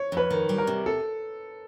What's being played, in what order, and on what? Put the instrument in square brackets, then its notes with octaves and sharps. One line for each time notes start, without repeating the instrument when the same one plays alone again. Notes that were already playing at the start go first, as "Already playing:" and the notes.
Already playing: [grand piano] C#5
[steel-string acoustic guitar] F2 [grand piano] B4
[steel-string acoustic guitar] D#3
G3
[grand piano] A#4
[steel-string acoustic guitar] C3
[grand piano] A4